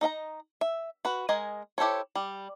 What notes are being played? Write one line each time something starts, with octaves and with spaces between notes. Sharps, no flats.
D#4 D#5 E5 A#5
E5
F#4 B4
G#3 A#4 D#5 G#5
E4 G4 A4 C5 C#5
G3